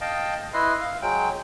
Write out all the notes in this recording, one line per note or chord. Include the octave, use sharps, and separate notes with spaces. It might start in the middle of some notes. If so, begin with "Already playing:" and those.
D#5 F5 G5 A5
E4 B4 D#5 C6
F5
F#3 G#3 G5